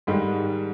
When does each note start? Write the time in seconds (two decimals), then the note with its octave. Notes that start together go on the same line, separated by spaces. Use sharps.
0.07 G#2 D#3 G3 G#3